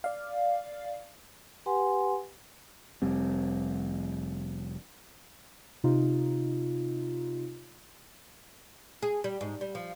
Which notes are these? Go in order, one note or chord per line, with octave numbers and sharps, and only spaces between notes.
D5 F5
G4 B4 F#5 G#5 C6
F1 G3 C4
C3 D#4 F4
G#4
G3
G#2
G3
F3